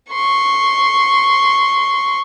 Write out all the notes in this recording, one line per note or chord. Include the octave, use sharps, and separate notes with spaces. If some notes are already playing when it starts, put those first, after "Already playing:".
C6 C#6